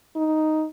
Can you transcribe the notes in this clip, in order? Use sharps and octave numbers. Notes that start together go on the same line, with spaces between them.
D#4